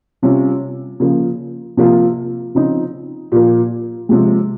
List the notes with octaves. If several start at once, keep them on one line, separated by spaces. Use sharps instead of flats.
C3 G3 C#4 F4
C#3 F3 A#3
C3 F3 A#3 F4
C#3 F3 C4 D#4
A#2 F3 A#3
C3 F3 G#3